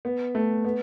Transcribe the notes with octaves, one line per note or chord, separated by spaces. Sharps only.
B3
A3
B3